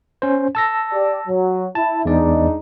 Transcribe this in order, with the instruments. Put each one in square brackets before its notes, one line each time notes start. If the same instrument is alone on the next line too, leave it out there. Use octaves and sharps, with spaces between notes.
[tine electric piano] C#4 C5
A5 E6 A#6
[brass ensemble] G4 D5
F#3
[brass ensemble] E4 [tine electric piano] A5
[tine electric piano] E2 D5 [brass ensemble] G#3 D4 D#4